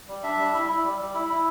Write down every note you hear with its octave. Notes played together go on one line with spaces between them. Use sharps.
G3
D4 E5
G3
E4
E4
G3
G3
E4
E4